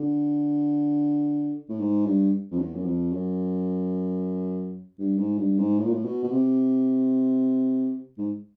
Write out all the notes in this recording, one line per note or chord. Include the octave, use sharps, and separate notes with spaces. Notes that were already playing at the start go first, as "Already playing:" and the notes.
Already playing: D3
A2
G#2
G2
F2
E2
F#2
F2
F#2
G2
G#2
G2
G#2
A2
A#2
A2
B2
B2
C3
G#2